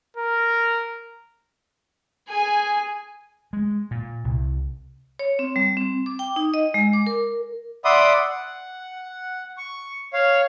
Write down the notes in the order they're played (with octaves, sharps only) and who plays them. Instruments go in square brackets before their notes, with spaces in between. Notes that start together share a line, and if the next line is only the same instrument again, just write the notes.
[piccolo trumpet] A#4
[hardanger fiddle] G#4 G#5
[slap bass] G#3
A#2
C2
[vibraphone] C#5
C4
G3
C4
D6
G5
D#4
D#5
G#3
D6
A#4
[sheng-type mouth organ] D5 E5 F#5 B5 C6 D#6
F#5
C#6
C#5 F5